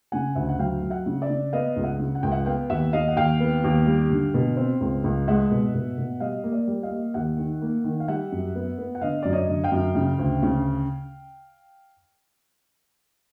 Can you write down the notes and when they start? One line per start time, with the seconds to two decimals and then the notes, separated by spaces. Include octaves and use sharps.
0.12 C#3 F#5 G#5
0.35 D2 E5 F#5
0.49 F#5
0.59 F#3 F5 G5
0.82 F#3
0.90 E5 F#5
1.06 C#3
1.22 D5 E5
1.30 C#3
1.53 B3 D#5 F5
1.76 C#2
1.84 E5 F#5
1.99 C#3
2.15 F#5
2.23 C#2 G5
2.32 E5 F#5
2.46 B3 F5 G5
2.70 D#2 E5 F#5
2.93 D#2 D#5 F5
3.08 F#5
3.16 D#2 F5 G5
3.40 B3
3.64 D#2
3.87 G3
4.10 D3
4.34 B2
4.57 C4
4.81 C#2
5.04 C#2
5.28 G#3 E5 F#5
5.51 B2
5.75 B2
5.98 B2
6.20 G3 D#5 F5
6.44 A#3
6.52 D5 E5
6.67 G3
6.83 D#5 F5
6.91 A#3
7.14 D#2 E5 F#5
7.37 D#3
7.62 A#3
7.84 D#3
8.00 F5
8.08 G3 E5 F#5
8.32 F#2
8.55 B3
8.78 B3
8.95 F#5
9.01 D3 D#5 F5
9.23 F#2 D5
9.33 C#5 D#5
9.48 D3
9.64 F5 G5
9.72 F#2
9.95 C#3
10.19 D2
10.43 C#3